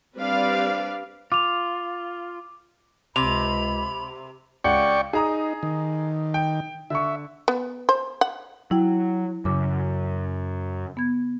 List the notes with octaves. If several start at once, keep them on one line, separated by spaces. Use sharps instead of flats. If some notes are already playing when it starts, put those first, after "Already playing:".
G3 C4 D4 B4 D5 F5
F4 D6 F7
C#2 C3 B5 F7
C#2 C#3 D5 F#5 G5 C#6
D#4 G#4 A#5 D#6
D#3
G5
D3 E5 C#6
B3
C5
F#5
F#3 E4 G5
F#2 C#3 D6
B3 G#6